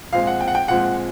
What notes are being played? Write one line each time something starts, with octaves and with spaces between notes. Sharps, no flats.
A#2 F3 G#3 C4 F5
F#5
G5
F#5
G5
A#2 F3 G#3 C4 F#5